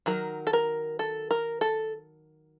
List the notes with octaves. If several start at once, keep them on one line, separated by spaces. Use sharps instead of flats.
D#3 F#3 A#4
A4
A#4
A4
A#4
A4